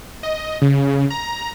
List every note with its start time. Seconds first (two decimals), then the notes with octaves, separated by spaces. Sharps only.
0.23 D#5
0.62 C#3
1.10 A#5